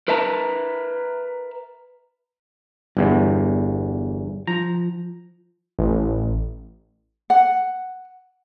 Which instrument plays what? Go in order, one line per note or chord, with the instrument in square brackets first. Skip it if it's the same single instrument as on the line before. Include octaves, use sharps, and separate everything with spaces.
[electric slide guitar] A#4 B4 E5 A5 A#5
[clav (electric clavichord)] G1 E2 [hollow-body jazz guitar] G2
[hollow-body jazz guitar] F3 [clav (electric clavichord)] A#5
[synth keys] A1
[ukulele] F#5